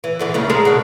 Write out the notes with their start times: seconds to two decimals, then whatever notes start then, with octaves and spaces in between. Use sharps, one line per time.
0.04 E3
0.19 E2 D3 E3
0.34 D#2 C#3 A3
0.50 G#3 A4 A#4
0.65 B2 D3